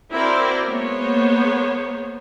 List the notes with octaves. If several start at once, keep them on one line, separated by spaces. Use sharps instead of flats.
C4 E4 F#4 A#4 C5 D5
G#3 A#3 B3 C5 C#5